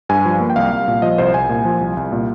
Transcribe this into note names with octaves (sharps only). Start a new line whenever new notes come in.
G2 G#5
F3
A#3
G5
C2 F5
C2
A#2
F3 D#5
C2 C5
C2 G#5
A#2
F3
C2
C2
A#2